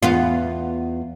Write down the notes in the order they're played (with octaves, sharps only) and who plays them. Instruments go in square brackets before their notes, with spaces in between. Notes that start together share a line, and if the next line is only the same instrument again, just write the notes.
[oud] E2 B3 F4